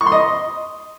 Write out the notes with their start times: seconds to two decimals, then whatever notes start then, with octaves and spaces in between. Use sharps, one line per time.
0.01 C#6
0.06 C6
0.12 D#5